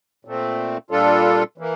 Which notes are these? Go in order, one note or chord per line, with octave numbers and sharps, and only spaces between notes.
A#2 A3 C4
A#2 G3 D4 F4 A4
E3 A#3